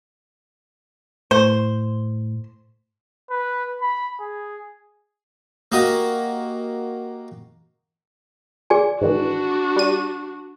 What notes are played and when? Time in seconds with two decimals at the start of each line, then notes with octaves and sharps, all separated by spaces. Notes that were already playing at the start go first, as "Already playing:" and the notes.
1.31 A2 C5
3.30 B4
3.81 B5
4.20 G#4
5.72 A#3 F#4 G4 D#5
8.70 G#4 D5 G#5
9.01 G#2 D#3 E3 D4 F#4
9.76 G3 D#7